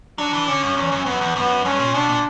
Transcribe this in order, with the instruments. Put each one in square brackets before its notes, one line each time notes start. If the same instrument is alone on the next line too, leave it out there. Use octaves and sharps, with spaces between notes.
[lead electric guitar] F#3 [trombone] D4
[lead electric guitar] E3
[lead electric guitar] D3 [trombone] C#4
[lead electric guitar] F#2
E2
F#2
[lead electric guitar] F#2 [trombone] B3
[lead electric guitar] E2
[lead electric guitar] F#2 [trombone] B3
[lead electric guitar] G2 [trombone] C#4
[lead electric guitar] A#2
[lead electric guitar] B2 [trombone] D4
[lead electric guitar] A#2